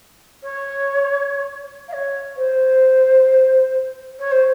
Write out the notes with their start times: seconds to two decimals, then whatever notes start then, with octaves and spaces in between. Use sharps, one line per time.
0.43 C#5
1.88 F5
1.93 C#5
2.37 C5
4.19 C#5
4.32 C5